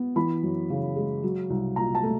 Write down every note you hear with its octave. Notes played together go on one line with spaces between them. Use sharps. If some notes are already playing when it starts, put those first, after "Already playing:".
Already playing: B3
E3 B5
F#2
C#3
G#3
F#3
C2
A#2 A#5
A5
A3